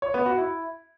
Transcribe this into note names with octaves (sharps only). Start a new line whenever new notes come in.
C#5
B3
F#4
E4